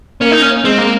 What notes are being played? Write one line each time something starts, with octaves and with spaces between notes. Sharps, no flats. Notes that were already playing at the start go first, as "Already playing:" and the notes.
A#3 C#4
D#4
C#4
G#3 C4
A#3